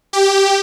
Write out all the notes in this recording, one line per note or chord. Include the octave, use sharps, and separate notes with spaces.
G4